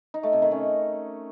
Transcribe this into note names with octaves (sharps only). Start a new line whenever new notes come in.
D#4
A3
C3
D#3
C#4